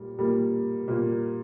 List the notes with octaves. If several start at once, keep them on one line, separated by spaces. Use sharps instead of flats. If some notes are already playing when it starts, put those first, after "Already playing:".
Already playing: A#2 G3 A#3
A#2 G3 A#3
A#2 G3 A#3